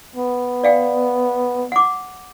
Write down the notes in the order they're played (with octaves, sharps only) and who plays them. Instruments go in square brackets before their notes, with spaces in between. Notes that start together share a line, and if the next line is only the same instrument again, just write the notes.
[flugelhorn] B3
[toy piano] D5 F5 G5
F#5 D6